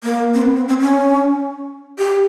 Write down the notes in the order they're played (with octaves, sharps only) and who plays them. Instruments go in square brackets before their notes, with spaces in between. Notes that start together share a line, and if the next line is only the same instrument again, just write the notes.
[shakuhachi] A#3
C4
B3
C4
C4
C#4
G4